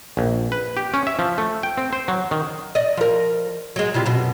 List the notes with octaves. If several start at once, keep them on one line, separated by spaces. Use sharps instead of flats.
A#1
B4
G4
C#4
E5
F3
A3
G5
C4
C5
F#3
D#3
D5 D#5
F3 A#4
F#3 G#3
C3 G3 F4
F#2 B2